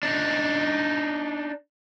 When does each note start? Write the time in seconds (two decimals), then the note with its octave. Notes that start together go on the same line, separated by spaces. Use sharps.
0.03 D4 D#4